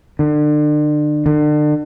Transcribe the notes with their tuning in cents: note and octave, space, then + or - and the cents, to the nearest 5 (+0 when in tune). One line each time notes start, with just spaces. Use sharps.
D3 +35
D3 +40